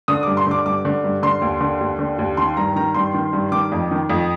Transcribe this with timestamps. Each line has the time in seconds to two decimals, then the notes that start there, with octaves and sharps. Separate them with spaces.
0.08 D3 D#6
0.23 G2 D6
0.37 C6
0.46 D3 D6
0.65 G2 D6
0.85 D3
1.04 G2
1.23 D3 C6
1.42 D#2
1.61 D3
1.81 D#2
1.99 D3
2.19 D#2
2.37 D#3 C6
2.57 G2 A#5
2.76 D#3 A#5
2.95 G2 C6
3.14 D#3
3.33 G2
3.52 D#3 D6
3.72 F2
3.91 D#3
4.10 F2